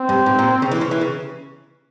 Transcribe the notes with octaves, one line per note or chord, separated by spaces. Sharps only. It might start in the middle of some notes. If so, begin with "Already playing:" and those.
Already playing: C4
G2
G#2
A#2
C#3
E3
C#3
E3
C#3